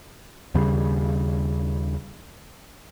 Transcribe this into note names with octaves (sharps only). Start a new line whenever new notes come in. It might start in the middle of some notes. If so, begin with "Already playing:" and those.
D#2 C#3 G3